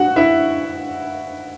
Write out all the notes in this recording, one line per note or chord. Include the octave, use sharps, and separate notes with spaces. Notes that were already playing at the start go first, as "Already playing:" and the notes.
Already playing: F#4 F#5
E4 E5